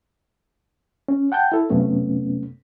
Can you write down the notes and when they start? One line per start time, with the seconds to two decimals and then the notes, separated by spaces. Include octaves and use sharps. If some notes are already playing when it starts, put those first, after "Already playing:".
1.08 C#4
1.32 F#5 G5 A5 G6
1.52 E4 A4
1.70 F#2 C3 A3 B3 C#4